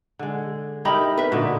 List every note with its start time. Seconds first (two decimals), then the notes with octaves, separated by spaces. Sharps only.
0.19 D3 G#3
0.85 D#4 E4 G4 A#4 D#5 B5
1.18 B4 E5
1.32 A#2 D3 D#4 F#4